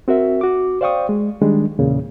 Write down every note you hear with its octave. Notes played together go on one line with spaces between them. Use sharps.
C4 F#4 A#4 E5
F#4 D6
C5 D5 F5 G5 C#6 D#6
G#3
D#3 G3 G#3 D4
E2 A#2 C#3